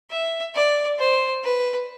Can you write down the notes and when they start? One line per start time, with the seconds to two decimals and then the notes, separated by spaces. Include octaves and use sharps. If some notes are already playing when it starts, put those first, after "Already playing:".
0.11 E5
0.55 D5
0.99 C5
1.44 B4